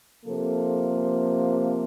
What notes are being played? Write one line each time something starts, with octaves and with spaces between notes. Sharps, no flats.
C3 F3 A#3 A4